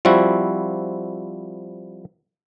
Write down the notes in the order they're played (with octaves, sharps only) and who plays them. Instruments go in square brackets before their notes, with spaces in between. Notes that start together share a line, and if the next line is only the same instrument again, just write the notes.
[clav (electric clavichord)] F3 G3 C4 E4 F#4